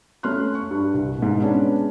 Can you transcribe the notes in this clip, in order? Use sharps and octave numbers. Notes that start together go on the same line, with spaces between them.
A3 C#4 C6 F6 F#6
C#6
G2
C2
G#2 B2
G#3 B3 C#4 D4